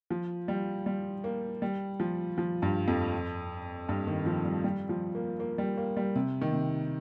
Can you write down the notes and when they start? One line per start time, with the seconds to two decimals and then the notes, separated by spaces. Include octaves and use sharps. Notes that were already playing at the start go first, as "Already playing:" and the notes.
0.10 F3
0.48 G3
0.86 G3
1.24 A#3
1.62 G3
2.00 F3
2.38 F3
2.62 G2
2.88 F2
3.89 G2
4.07 D#3
4.26 F3
4.45 G3
4.64 G3
4.89 F3
5.15 A#3
5.40 A#3
5.58 G3
5.78 A#3
5.97 G3
6.15 C3
6.41 D#3
6.53 C3